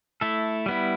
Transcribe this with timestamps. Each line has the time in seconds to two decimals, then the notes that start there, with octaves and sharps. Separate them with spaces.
0.21 A3 E4 A4
0.66 G3 B3 E4